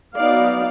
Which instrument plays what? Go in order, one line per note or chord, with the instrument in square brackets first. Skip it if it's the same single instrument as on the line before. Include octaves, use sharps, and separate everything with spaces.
[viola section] F#3 B3 D#4 D5 F5